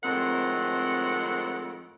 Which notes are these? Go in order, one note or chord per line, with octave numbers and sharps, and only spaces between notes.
F2 A2 D#3 G#3 C4 F#5